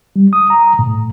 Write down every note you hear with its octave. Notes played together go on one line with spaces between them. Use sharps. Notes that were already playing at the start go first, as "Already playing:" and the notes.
G3
D#6
A#5
A2